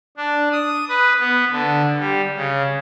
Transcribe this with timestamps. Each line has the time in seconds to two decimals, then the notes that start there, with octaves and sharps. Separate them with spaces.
0.17 D4
0.52 D#6
0.89 B4
1.20 B3
1.50 D3
1.98 G3
2.36 C#3